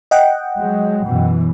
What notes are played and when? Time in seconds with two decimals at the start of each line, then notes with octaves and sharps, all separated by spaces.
0.11 D#5 F#5 G5
0.58 F#3 G#3
1.06 F#2 B2 E3